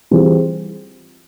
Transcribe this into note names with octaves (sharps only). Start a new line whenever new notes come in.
E3 G3 C4 F4 G#4